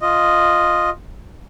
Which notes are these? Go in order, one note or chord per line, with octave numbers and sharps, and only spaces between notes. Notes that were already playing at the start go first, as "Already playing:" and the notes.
F4 D#5